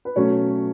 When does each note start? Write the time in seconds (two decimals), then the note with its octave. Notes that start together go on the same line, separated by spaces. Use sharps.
0.05 B4
0.16 B2 F#3 A3 C#4 C#5